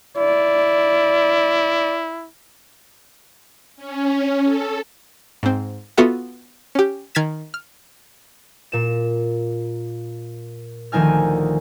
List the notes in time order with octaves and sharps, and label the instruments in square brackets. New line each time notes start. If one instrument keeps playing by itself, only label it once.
[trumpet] E4 [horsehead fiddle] D5
[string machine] C#4
A4
[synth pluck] G#2 C4
B3 F4 F#4 A4 E5 F#5
C#4 G4
D#3 F6 G#6 A6 B6 E7
F6
[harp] A#2 E7
D2 D#3 F3 D#4 G#5 F6